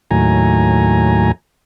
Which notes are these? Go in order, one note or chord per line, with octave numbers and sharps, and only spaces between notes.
D#2 A2 F#3 G#5 A#5